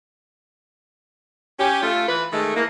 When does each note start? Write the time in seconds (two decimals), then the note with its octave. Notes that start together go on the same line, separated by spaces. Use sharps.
1.60 C#4 G4
1.83 A3 F4
2.08 E3 B4
2.33 D#3 G#3 A3
2.56 E3 A#3